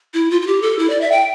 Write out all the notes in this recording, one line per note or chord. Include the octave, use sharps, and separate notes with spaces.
E4
F4
F4
G4
A4
E4
D5
E5
G5